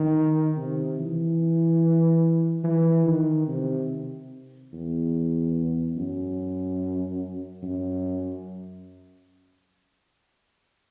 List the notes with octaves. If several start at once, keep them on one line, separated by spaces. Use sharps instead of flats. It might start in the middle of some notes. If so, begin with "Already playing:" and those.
Already playing: D#3
C3
E3
E3
D#3
C3
E2
F#2
F#2